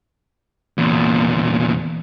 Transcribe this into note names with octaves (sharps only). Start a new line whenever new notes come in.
E2 A#2